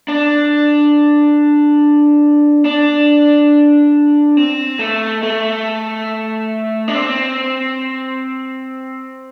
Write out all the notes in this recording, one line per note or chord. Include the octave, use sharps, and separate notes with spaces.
D4
D4
C4
A3
A3
D4
C4